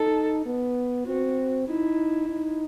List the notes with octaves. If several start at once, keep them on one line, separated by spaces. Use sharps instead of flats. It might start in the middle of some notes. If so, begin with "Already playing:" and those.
Already playing: D#4 A4
B3
C4 F#4
D#4 E4
D#4